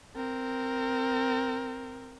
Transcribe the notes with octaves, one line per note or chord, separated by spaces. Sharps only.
C4 A#4